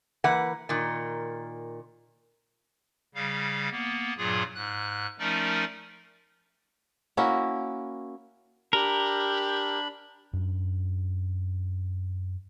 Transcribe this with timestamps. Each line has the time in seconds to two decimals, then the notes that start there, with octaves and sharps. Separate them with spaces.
0.24 E3 A#3 B4 F#5
0.69 A#2 D#3
3.15 C#3 G3 F5
3.71 A#3 B3
4.17 G2 A#2 F#3 F4 G#4
4.55 G#2 F#6
5.19 F3 A3 C#4 D#4 A#4 D5
7.17 A#3 C#4 E4 F#4
8.73 D4 G4 A#4 B5
10.33 F#2 D4